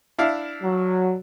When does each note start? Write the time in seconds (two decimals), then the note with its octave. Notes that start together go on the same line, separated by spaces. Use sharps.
0.19 D4 E4 F5
0.63 F#3